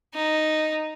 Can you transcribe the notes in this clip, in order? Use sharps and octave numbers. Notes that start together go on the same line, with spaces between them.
D#4